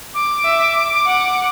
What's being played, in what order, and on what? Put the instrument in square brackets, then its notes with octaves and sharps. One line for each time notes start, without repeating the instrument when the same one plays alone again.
[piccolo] D6
[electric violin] E5
F#5